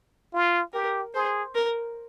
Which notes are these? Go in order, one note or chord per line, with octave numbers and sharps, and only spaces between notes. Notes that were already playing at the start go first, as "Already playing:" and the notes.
F4
G4 A#4
G#4 C5
A#4